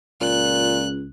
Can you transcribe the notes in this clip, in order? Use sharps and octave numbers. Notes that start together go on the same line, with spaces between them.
C#2 A#2 F#6